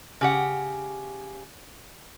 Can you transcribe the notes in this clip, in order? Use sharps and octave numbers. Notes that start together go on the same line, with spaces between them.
C#3 G4 F#5